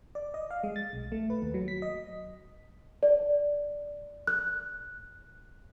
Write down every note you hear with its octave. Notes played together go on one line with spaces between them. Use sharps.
D5
D#5
F5
G#3
A6
B1
A3
B4
D#2
F#3
B6
D#5
D5
F#6